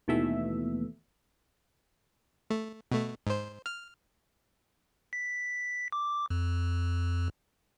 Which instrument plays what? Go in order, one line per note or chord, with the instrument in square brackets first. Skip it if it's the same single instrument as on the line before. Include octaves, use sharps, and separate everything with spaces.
[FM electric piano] D#2 B2 E3 A3 E5
[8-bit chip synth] A3
B2 A3
G#2 C5
F6
B6
D6
F2